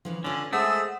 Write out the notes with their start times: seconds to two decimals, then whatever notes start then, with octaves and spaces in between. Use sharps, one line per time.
0.05 C#3 E3 F3
0.24 D3 C#4 F4 D5
0.53 G#3 A3 G#4 C5 F#5 D#6 E6